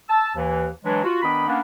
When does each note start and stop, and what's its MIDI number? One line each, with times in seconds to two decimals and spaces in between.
0.09 0.30 81
0.09 0.30 88
0.36 0.67 39
0.36 0.67 52
0.85 1.03 52
0.85 1.03 54
0.85 1.03 56
0.85 1.03 62
1.04 1.21 65
1.04 1.21 66
1.22 1.45 51
1.22 1.45 59
1.22 1.45 62
1.22 1.45 75
1.22 1.45 83
1.47 1.59 58
1.47 1.59 59
1.47 1.59 61
1.47 1.59 62